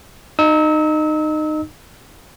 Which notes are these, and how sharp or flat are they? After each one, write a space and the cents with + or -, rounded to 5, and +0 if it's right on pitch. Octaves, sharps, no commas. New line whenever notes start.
D#4 -20 E6 -35